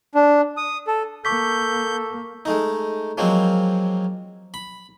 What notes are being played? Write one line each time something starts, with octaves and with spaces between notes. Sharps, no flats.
D4
D#6
A4
A#3 A4 C#6 D6 G6 B6
G#3 A3 D#4
F3 F#3 G#3 A#3 C4
B5